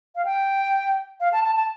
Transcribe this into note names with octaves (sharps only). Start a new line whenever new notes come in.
F5
G5
F5
A5
A5
A5